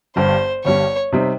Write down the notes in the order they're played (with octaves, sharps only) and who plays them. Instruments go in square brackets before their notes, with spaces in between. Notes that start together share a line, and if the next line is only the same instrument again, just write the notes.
[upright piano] G1 G2 G3 [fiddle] C5
[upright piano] G1 G2 G3 [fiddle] C#5
[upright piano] C3 G3 C4 D#4